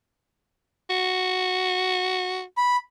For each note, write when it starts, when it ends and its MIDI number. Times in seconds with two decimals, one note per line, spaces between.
0.90 2.43 66
2.57 2.76 83